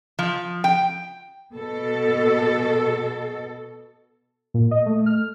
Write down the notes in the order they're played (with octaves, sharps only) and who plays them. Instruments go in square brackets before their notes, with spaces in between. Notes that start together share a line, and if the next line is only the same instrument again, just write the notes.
[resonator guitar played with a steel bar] F3
G5
[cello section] B2 A4
[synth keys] A#2
D#5
A3
F6